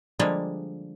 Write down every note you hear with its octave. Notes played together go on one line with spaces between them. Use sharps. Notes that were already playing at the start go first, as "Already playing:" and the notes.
D3 F3 G3 G#3 A#3 D4